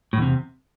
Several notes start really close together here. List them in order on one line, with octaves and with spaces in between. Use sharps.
A2 E2 C3